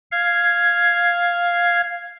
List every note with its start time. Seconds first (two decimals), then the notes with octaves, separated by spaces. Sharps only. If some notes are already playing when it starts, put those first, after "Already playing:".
0.11 F5 G#6